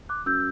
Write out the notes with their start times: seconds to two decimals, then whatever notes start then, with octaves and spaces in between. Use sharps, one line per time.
0.09 D6 F#6
0.26 F#2 E6 G6